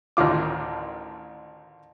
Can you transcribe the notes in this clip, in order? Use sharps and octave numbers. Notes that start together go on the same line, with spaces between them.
A1 D2 D#3 F4 D6